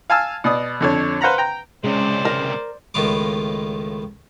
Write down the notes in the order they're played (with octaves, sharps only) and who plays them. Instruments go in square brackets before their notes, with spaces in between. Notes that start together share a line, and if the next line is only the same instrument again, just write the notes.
[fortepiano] F5 G#5 A5 E6 F6
B2 D5 D#6
F2 D3 C#5
B4 C5 F5 F#5 A#5 B5
G5 A#5
[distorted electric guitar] C#2 C3 [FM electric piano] G#3 C#4 [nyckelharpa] C5 D5
[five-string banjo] A#4
[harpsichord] C#2 A2 D#3 B3 F4 D6